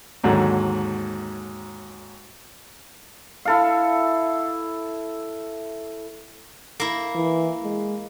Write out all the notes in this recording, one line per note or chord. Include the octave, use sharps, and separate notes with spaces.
D#2 G#2 D3 F#3
E4 A4 F5
A#3 E4
E3
G#3